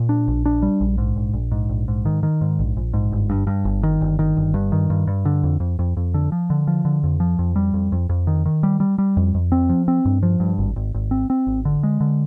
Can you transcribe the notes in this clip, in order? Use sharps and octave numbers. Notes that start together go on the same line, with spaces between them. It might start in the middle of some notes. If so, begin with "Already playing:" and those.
Already playing: A#2
D4
A#1
D4
G3
A#1
G#2
A#1
A#1
G#2
A#1
G#2
D#3
D#3
G#2
A#1
A#1
G#2
G1
G2
G2
G1
D#3
G1
D#3
G1
G2
D#3
G2
G2
D3
F2
F2
F2
F2
D3
F3
D3
F3
D3
F2
F3
F2
G3
F2
F2
F2
D#3
D#3
G3
G3
G3
F2
F2
C4
F3
C4
G2
F3
G2
G#1
G#1
G#1
C4
C4
G#1
D3
G#3
D3